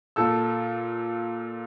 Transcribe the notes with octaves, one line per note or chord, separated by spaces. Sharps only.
A#2 A4 E6